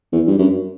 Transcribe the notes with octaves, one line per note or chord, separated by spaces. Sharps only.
E2
G2
F#2